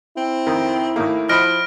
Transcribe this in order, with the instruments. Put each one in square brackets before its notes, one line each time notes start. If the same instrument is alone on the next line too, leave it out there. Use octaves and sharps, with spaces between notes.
[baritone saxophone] C4 [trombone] E4
[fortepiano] F2 D#3
A2 D#3 A#3
[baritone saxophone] F3 [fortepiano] D#5 F#5 B5 [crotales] F6 A#6 D7